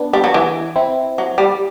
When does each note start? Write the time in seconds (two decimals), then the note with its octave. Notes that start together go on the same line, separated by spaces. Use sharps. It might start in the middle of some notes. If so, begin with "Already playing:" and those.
Already playing: B3 D4
0.13 G3
0.24 F#3
0.34 E3
0.76 C4 E4
1.18 F#3
1.38 G3